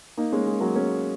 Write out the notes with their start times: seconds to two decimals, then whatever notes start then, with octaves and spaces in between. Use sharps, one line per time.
0.17 A#3 D#4
0.32 G#3 C#4
0.46 G#3
0.61 F#3 A#3
0.76 G#3 C#4